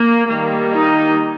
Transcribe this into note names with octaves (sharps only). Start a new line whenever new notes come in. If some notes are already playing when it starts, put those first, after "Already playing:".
Already playing: A#3
D#3 G3 A#3
D#4